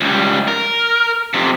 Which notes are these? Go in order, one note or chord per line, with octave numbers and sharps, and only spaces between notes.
C#2 G3
A#4
F2 C3